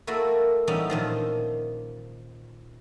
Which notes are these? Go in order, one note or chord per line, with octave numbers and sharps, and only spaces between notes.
A3 A#3 E4 F#4 D5
E3 G3 B3 C#4 D#4
A#2 D#3 F3